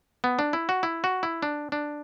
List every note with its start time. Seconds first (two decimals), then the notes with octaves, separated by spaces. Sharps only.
0.24 B3
0.39 D4
0.53 E4
0.69 F#4
0.83 E4
1.04 F#4
1.23 E4
1.42 D4
1.72 D4